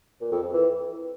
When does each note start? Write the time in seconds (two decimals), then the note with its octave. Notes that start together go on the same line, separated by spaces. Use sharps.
0.21 A#2
0.32 F2
0.42 F2
0.53 E3